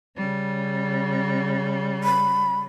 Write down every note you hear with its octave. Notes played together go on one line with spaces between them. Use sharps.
C#3 G3
B5